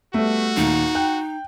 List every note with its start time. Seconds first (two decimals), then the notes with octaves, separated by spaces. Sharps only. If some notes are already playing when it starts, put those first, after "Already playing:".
0.14 G3 A3 B3 F#4
0.57 D#2 A#2 D#3 D#4
0.95 G5 F#6